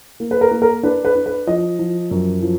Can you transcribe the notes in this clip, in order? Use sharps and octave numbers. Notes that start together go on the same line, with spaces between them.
A#3
B4
A#4
A#3
A#4
D4 B4
B4
D4
B4
F3 D#5
F3
F#2
F3